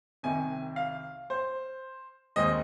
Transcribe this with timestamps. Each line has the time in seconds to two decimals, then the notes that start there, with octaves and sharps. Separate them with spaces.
0.23 C2 C3 D#3 G#5
0.76 F5
1.30 C5
2.36 D#2 D#3 G#3 C4 D#5